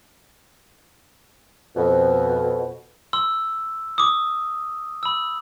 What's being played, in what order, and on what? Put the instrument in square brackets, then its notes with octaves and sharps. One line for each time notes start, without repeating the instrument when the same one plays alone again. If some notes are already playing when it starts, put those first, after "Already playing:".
[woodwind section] F2 B2
[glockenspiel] C6 E6
D6 D#6
B5 E6